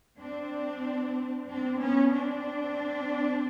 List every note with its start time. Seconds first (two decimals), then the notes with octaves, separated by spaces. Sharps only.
0.20 C4 D4
1.48 C4 D4
1.80 B3 C#4
2.13 C4 D4